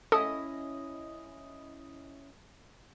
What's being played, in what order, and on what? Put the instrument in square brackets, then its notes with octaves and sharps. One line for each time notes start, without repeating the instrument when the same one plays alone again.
[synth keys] C#4 E4 D#5 [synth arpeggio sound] A4 [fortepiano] D#6